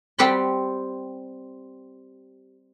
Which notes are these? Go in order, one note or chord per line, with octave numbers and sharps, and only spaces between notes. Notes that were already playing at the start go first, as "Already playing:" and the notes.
G3 C4 G4 F#5 B5 C6